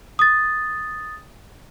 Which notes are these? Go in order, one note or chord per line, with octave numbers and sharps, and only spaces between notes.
D#6 A6